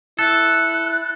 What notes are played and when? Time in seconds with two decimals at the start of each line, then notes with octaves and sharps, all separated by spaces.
0.19 E4 A4 F#6